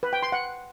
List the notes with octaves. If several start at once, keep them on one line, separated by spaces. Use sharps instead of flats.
B4
G5
C6
F#5